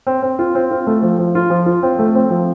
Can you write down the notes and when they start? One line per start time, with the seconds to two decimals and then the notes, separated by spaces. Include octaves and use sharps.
0.07 C4
0.23 C4
0.39 F4
0.55 C4
0.71 F4
0.87 A3
1.02 F3
1.18 F3
1.35 F4
1.50 F3
1.66 F4
1.83 C4
1.99 A3
2.15 C4
2.30 F3